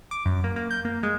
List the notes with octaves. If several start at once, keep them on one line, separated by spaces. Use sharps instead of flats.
D6
F#2
A#3
A#3
G6
A#3
G#3